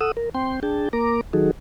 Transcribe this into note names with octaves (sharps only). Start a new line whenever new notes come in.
A4 F#5 D#6 E6
A#4
C4 G5 C6
D4 G#4 G5 A5
A#3 A#4 A#5 D6
D#3 F#3 D#4 F#4 G#4 A4